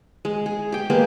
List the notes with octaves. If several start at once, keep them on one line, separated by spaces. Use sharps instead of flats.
G#3
G#4
G4 G5
G#3 A#3 B3 G4